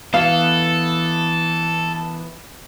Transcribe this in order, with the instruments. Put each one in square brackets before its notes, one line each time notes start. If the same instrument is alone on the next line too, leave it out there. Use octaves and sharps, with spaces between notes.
[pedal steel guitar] E3 B3 [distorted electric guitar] A4 [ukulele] F5